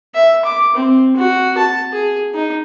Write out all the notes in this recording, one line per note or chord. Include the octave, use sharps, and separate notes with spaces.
E5
D6
C4
F#4
A5
G#4
D#4